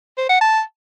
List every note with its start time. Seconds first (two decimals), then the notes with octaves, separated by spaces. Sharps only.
0.18 C5
0.29 F#5
0.41 A5